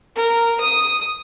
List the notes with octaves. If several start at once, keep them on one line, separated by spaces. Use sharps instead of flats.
A#4
D#6